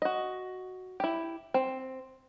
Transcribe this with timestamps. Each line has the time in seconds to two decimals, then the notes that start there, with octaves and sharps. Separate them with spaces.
0.02 F#4 D#5
1.00 E4 G4
1.54 C4